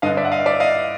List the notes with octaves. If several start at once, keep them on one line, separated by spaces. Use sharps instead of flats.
G2 D3 D#5 F5
D5 E5
F#5
D#5 F5
D5 E5
D#5 F5